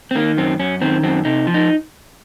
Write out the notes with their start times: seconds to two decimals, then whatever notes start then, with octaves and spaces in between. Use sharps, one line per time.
0.11 C4
0.15 D#3 A#3
0.38 F#2 C4
0.59 F#2 C#4
0.81 D#3 C4
1.03 F#2 C4
1.25 C3 D#4
1.47 F3
1.54 D#4